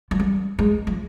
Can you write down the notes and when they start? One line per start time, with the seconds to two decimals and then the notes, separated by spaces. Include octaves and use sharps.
0.11 F3
0.20 G3
0.59 G#3
0.87 F3